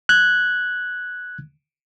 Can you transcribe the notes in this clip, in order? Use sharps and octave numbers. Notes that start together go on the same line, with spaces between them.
F#6 G#6